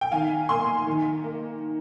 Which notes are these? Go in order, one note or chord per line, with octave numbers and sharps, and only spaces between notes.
G5
D#3 F5 G#5
A#3 G#5 C6
D#3
A#3